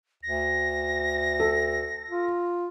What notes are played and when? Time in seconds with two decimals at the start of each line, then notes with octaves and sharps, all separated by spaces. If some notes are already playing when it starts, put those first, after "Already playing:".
0.23 D2 A#6
1.40 A4
2.10 F4